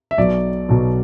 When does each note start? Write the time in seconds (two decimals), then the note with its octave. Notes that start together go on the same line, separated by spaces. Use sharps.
0.11 E5
0.18 B1 B2 F#3 D5
0.69 B1 B2 F#3